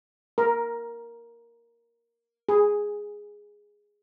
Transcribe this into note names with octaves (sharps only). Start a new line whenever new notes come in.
A#4
G#4